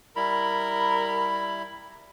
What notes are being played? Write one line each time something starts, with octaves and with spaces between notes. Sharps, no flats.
G3 E4 A#4 B5